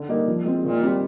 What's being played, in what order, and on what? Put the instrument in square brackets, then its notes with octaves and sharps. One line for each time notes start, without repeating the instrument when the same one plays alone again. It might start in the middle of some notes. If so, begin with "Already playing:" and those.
Already playing: [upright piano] D3
G3 A#3 D#4
F3
G#3 C4
[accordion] A#2 [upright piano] D#3
[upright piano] G3 C4 G4